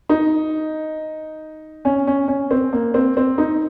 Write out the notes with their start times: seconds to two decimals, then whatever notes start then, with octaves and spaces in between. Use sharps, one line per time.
0.09 D#4
1.85 C#4
2.07 C#4
2.28 C#4
2.51 C4
2.73 A#3
2.94 C4
3.17 C4
3.38 D#4